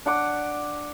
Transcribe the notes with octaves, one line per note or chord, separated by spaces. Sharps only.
D4 F#5 D6